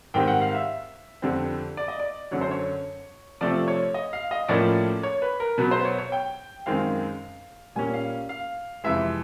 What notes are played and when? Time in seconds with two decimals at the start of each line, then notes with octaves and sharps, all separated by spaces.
0.14 G#2 D#3 G3 C4 G5
0.28 F#5
0.42 F5
0.55 E5
1.22 F2 D3 G3 C4
1.77 D5
1.88 D#5
2.00 D5
2.31 F#2 D3 F#3 C#5
2.41 C5
2.51 C#5
3.41 C3 F3 A3 C4 D5
3.68 C#5
3.94 D#5
4.13 F5
4.31 D#5
4.48 A2 F3 A#3 C#4 D5
5.03 C#5
5.22 B4
5.40 A#4
5.58 B2 F#3 B3 B4
5.71 C5
5.85 C#5
5.98 C#5
6.12 G5
6.66 F#2 D#3 G#3 C4 F5
7.75 A#2 G3 A#3 C#4 G#5
7.94 F5
8.29 F5
8.84 F2 C3 E3 G#3 E5